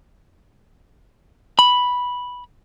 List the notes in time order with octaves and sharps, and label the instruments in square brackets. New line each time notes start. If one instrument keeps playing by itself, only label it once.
[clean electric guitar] B5